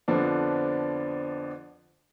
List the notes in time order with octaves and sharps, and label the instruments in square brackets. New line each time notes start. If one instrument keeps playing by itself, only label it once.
[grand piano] F2 D3 F3 B3 D4